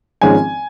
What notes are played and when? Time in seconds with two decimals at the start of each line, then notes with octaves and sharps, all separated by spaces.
0.21 G#1 G#2 F3 G#3 C#4 G#5